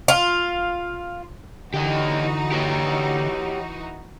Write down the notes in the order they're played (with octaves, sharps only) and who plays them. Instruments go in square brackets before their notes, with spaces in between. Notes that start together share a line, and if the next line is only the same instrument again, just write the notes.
[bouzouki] F4
[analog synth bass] D3 [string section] E3 D#4 F#4 [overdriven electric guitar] G4 D#5
[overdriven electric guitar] G4 C#5